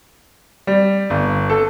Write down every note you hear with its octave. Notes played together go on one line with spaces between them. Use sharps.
G3
G1
A4